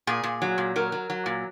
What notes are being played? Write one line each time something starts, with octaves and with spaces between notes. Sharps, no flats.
A#2 G#4
A#2
F#3
A#2
F#3 A#4
F#3
F#3
A#2